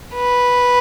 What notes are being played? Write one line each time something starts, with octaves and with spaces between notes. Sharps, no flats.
B4